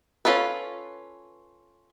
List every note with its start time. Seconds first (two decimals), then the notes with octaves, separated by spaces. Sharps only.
0.25 C#4 D4 F4 A4 B4